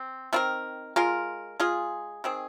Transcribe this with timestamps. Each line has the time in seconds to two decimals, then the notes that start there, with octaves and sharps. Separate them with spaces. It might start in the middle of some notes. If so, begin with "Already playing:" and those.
Already playing: C4
0.33 D#3 C4 F4 A#4
0.96 G#3 F4 A#4
1.60 G#3 F4 G#4
2.24 D#3 C4 G#4